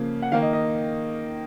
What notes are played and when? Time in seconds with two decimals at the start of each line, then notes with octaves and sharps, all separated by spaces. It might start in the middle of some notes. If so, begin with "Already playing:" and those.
Already playing: C#3 F3 A#3
0.22 F#5
0.32 D#3 A#3 F5
0.42 D#5
0.53 D#5